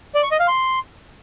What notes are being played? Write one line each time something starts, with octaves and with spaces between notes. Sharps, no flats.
D5
C#6
D#5
F5
C6